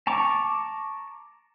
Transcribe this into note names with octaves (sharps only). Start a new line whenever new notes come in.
A5 A#5 C#6 D6